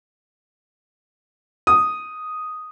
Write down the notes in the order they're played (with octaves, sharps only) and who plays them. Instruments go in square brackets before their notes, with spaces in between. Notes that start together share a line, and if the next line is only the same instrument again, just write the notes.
[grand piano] D#6